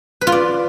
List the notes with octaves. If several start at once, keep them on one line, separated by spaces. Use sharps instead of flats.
B4
F4
D5